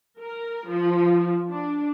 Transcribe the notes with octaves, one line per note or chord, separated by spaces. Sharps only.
A#4
F3
D4